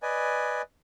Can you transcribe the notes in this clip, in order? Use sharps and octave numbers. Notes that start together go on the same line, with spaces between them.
B4 D5 D#5 G#5